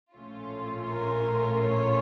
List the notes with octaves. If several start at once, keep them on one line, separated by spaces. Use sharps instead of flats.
A#1 A2 A3 C#4 F4
A#4
C#5